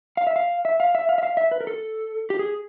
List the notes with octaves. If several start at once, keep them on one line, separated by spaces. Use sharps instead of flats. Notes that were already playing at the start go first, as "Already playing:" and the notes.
F5
E5
F5
E5
F5
E5
F5
E5
F5
E5
B4
A#4
A4
G4
G#4